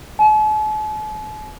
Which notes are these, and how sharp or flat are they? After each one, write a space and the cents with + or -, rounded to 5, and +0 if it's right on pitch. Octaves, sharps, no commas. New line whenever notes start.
A5 -45